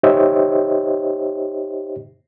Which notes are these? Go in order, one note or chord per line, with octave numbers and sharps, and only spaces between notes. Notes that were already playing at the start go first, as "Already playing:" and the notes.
D#4 G4 C5 C#5 D#5 E5